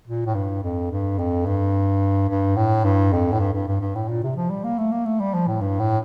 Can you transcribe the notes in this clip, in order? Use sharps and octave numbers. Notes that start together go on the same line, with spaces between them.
A#2
A2
G2
F2
G2
F2
G2
G2
A2
G2
F2
A2
G2
G2
G2
G2
A2
A#2
C3
F3
G3
A#3
A3
A#3
A3
G3
F3
A2
G2
A2